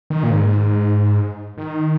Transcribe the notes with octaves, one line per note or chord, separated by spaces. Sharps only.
D#3
A#2
G#2
D#3